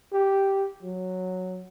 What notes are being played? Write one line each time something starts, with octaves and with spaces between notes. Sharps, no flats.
G4
F#3